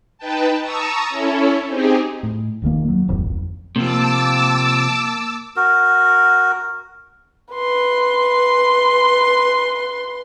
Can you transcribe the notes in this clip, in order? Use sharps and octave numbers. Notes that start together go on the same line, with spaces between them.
D#4 B4 G5 A5
A5 A#5 C#6 D#6 E6
C#4 E4 A4 C#5
C4 D#4 G4 G#4
A2
F1 D#2 D#3 A#3
F#3
D1 G#1 F2
C3 F3 A#3 A5 D6 E6
F#4 A#4
B4 C6